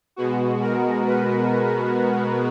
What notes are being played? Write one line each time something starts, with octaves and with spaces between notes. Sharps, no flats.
B2 G#3 B3 F#4
A#4
B4